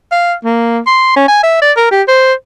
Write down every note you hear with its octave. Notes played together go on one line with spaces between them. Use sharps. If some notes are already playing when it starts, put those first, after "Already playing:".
F5
A#3
C6
C#4
G#5
E5
D5
A#4
G4
C5